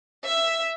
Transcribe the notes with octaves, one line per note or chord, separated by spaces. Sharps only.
E5